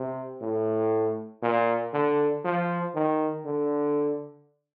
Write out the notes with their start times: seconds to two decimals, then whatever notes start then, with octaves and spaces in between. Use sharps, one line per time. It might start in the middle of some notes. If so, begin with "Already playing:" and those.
Already playing: C3
0.41 A2
1.42 A#2
1.93 D3
2.44 F3
2.95 D#3
3.45 D3